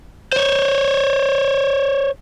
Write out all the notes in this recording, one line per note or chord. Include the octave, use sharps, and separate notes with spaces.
C5 C#5